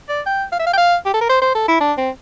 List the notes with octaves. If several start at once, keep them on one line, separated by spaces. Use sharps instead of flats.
D5
G5
F5
E5
F5
G5
F5
G4
A4
A#4
C5
C5
A4
E4
D4
C4